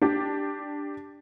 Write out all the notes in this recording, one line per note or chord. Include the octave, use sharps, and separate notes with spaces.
D4 G4